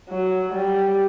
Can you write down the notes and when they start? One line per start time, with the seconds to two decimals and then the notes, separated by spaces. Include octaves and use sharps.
0.10 F#3
0.54 G3